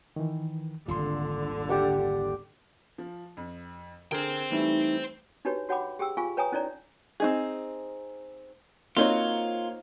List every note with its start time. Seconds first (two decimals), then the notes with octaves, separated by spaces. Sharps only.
0.16 D#3 E3
0.88 D#1 G#1 D3 F4 C6
1.69 G4 D5 F#5
2.98 F3
3.37 F2
4.12 D3 G#4 A#4 C5 G5
4.51 E3 G3 A3 D#4
5.45 D4 D#4 F#4 G4 B4 C#5
5.69 F#4 C#5 F#5 G5 B5 D6
5.99 G4 G#4 G5 E6
6.17 F4 G#4 F5 G#5 C#6
6.37 B4 C#5 G5 G#5 A#5 D#6
6.52 C#4 D#4 E4 C#5 D5 A#5
7.20 C4 D#4 G#4
8.97 A#3 C4 D#4 F4 F#4 C#5